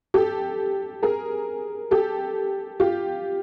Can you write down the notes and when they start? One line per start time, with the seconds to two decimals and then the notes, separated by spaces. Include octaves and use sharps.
0.14 G4 A4
1.03 G#4 A#4
1.91 G4 A4
2.80 F4 G4